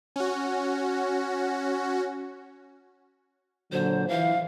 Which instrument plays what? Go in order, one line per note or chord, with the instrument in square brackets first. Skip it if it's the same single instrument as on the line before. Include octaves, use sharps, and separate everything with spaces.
[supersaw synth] C#4 F#4
[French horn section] A#2 D3 F#3 [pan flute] C5
[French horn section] E3 [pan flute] F5